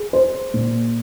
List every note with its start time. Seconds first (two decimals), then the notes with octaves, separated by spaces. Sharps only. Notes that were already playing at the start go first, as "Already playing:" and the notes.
Already playing: G#4
0.13 C5
0.54 A#2